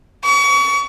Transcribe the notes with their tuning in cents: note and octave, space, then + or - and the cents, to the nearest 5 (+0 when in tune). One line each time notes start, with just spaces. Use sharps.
C#6 +35